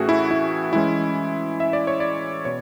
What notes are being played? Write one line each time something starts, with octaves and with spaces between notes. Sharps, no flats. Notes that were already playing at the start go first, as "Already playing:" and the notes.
Already playing: A2 E3 A3 C#4 F#4 G#4
E4
E4
E3 G#3 C#4 E4
E5
D5
C#5
D5
B2 C#5